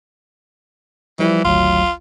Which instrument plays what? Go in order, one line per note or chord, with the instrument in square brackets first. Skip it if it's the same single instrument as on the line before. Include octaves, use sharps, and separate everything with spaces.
[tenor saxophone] E3 [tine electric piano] F3 G3 E4
[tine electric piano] G#1 D2 F#3 [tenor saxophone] F4